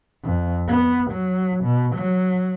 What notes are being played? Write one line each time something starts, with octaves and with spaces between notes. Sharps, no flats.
F2
B3
F#3
B2
F#3